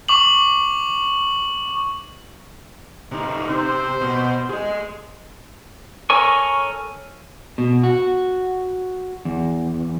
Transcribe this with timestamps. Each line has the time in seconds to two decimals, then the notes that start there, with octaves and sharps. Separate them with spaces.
0.09 C#6 D6 F#7
3.12 C3 D#4
3.50 C3 C5
4.01 B2
4.50 G#4 D#5
6.10 A4 A#4 C#5 G#5 C#6
7.58 B2
7.84 F#4
9.25 E2